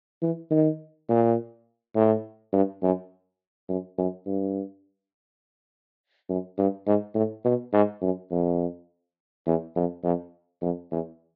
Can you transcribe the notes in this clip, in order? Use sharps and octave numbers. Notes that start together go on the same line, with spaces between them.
E3
D#3
A#2
A2
G2
F#2
F#2
F#2
G2
F#2
G2
G#2
A2
B2
G#2
F#2
F2
E2
F2
F2
F2
E2